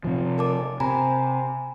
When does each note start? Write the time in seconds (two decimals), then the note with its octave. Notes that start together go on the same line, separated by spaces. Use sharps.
0.04 C3 F3
0.38 A#4 A5 D6
0.80 C3 G#5 A#5 B5